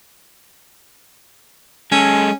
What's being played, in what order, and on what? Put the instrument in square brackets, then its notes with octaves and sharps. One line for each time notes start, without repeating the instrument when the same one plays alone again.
[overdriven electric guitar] G#3 A4 [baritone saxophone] C#4